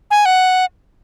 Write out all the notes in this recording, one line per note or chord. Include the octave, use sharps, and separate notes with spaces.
G#5
F#5